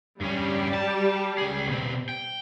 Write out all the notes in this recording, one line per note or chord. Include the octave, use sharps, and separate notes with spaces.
G2 G3 C#4 G4
A5
C#2 G#4
B2 C4
G5